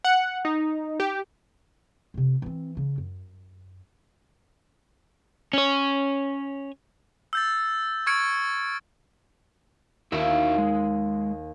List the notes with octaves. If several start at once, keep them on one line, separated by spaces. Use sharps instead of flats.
F#5
D#4
G4
F2 C3
E3 C4
C#3 C#4
F#2
C#4 C#5
E6 G6 A6
C#6 F6 G#6 C#7 D7
D#2 E4 F#4 E5
G#3